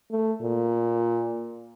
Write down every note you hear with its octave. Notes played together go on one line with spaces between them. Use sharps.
A3
A#2